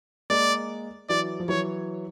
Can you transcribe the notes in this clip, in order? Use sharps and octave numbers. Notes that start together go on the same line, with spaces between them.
G#3 A#3 D5
E3 F#3 D5
F3
E3 F#3 C#5